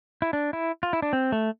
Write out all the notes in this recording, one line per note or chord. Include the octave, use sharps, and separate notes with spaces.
E4
D4
E4
F4
E4
D4
C4
A3